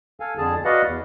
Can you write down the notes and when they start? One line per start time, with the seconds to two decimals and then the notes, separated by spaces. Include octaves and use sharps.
0.20 A4 F5 G#5
0.38 F2 D3 G#4 A5
0.65 F#4 B4 D5 D#5 F5 F#5
0.86 E2